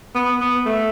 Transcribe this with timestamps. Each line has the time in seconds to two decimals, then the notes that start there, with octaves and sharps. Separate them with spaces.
0.15 B3
0.40 B3
0.66 A3